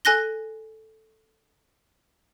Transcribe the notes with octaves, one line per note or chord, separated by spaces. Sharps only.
A4 G#5 F#6 A#6 G7